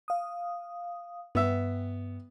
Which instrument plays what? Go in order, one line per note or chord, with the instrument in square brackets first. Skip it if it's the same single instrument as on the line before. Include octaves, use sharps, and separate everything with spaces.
[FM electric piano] F5 D#6
[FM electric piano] G2 [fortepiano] B3 E5